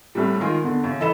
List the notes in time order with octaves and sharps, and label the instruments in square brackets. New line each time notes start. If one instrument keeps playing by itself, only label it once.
[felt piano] C2 A2 C3 G3
D#3 G#3 F4 G#4 A#4
E2 D3
F#2 C#3
E3 A4 D#5 B5 E7